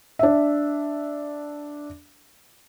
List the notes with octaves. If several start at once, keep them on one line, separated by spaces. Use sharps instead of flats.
D4 E5